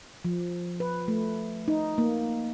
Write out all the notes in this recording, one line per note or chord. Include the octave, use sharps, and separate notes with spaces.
F3
B4
A3
D#4
A#3